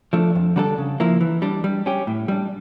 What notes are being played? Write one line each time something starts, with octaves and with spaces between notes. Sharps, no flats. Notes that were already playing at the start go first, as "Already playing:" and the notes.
F3 A3 D4
F2
D3 G3 D4 A4
C#3
F3 A#3 E4
E3
G3 D4
G3
C#4 G4
A2
G3 D4